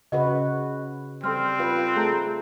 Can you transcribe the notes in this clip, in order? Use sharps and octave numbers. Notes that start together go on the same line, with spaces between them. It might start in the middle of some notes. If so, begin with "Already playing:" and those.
C#3 F#4 B4 D#5
G3 C4 A4 C6 F6
F4 B4
A3 G#4 A5 A#5